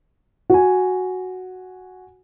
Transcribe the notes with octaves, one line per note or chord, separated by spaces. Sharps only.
F#4 G#5